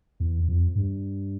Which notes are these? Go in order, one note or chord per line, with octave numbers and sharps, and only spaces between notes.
E2
F2
G2